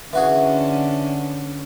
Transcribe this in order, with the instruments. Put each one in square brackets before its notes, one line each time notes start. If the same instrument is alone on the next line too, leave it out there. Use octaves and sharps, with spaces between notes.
[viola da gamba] D3 C#4 [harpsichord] E3 F#4 G#4